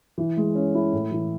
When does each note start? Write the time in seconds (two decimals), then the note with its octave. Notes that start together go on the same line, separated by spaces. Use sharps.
0.18 E3
0.37 G#3
0.55 C#4
0.75 E4
0.92 A2
1.11 E3